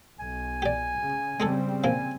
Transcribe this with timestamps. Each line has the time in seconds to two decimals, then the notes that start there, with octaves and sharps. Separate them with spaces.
0.20 B1 G#5
0.62 G4 D5
0.97 C#3
1.40 C#3 G3 G#3 C4 G#4 A4
1.84 C3 F3 A#3 G#5